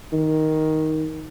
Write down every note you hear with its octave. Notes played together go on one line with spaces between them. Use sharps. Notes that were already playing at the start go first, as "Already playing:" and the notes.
D#3